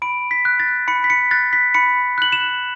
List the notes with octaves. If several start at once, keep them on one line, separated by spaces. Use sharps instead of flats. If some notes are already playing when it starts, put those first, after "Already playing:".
B5 D7
B6
F#6
A6
B5 C#7
B6
C#7
F#6 A6
B6
B5 C#7
F#6 F#7
E7